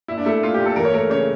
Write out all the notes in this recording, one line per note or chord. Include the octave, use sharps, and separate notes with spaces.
A#2 E4
D4
A3 E4
A#2 F4
A#2 G4
A4
E3 A#4
C#5
A3 A#4
C#3 C#5